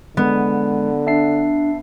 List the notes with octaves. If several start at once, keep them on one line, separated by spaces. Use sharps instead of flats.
D3 G#3 B3
D4 E5 A5 C7